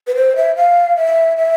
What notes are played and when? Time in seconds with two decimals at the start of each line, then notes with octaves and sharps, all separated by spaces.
0.07 B4
0.15 C5
0.36 E5
0.56 F5
0.96 E5
1.37 E5